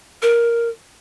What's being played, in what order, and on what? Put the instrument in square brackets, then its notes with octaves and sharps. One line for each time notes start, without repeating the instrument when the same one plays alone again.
[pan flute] A#4